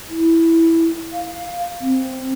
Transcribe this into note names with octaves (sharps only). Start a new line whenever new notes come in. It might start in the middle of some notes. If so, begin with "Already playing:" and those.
E4
F5
C4